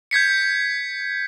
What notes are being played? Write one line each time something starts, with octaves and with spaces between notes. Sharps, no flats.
G6 G#6 B6 C#7